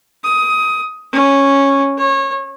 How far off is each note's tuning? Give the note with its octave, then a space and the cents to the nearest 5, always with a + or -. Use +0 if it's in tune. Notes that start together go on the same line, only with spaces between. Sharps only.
D#6 +20
C#4 -5
C#5 -25